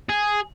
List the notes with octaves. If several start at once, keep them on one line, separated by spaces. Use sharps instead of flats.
G#4